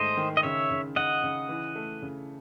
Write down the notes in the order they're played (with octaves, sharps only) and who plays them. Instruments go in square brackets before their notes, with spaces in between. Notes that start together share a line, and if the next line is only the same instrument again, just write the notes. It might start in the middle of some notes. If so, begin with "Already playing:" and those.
Already playing: [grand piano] G#2 D#3 A3 [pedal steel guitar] C5 D#5
[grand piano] D#3
[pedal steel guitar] D#5
[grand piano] C#3 [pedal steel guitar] C#5 E5
[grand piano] C#3
[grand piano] C#3 [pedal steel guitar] D#5 F#5
[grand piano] C#3
E3
A3
C#3